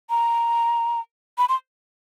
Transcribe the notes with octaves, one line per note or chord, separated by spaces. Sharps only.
A#5
B5
C6